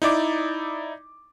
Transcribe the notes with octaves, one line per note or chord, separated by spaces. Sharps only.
D#4 E4 D5 D6